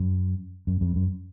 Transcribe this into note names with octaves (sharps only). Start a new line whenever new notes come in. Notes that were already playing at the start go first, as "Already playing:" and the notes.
Already playing: F#2
F#2
F2
F#2